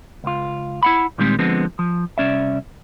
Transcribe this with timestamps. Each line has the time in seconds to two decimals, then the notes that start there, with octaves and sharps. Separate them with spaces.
0.24 C#2 F4
0.83 E4 F#5 B5
1.18 A#2 D3 D#3 G3 G#3 C4
1.39 D3 F3 G#3 B3 C4
1.79 F3
2.18 C2 C#4 D5 E5